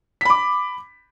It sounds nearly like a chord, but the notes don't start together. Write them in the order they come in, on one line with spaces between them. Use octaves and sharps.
B6 B5 D6